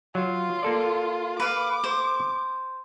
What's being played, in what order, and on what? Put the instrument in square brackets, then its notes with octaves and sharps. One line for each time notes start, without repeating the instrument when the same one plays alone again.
[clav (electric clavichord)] F#3 [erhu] F4
[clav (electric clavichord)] A#3 A4 D5
[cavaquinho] B4 F5 [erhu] D6
[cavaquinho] C5